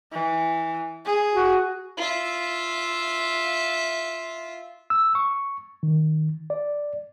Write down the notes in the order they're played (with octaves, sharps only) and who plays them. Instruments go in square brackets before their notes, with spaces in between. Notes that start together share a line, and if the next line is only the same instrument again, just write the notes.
[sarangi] E3
G#4
[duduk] F#4
[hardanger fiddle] F4 E5
[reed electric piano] E6
C#6
D#3
D5